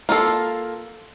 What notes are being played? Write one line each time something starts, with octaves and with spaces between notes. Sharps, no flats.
A#3 F4 A4